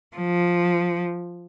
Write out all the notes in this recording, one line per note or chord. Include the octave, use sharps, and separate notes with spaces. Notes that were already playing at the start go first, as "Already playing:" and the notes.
F3